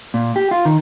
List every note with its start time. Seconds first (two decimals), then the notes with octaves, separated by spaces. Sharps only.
0.14 A#2
0.36 G4
0.51 F4
0.65 D#3